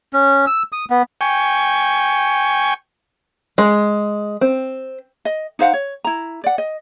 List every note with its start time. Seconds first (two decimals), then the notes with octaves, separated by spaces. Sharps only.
0.13 C#4
0.47 E6
0.72 D#6
0.90 B3
1.21 G5 G#5 C#6
3.58 G#3
4.41 C4
5.25 D#5
5.59 D#4 C5 F5 F#5
5.73 C#5
6.05 E4 A#5
6.44 D5 F#5
6.58 D#5